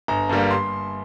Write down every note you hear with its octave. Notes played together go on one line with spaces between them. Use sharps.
G1 A#5
G2 D3 G3 A#3
C6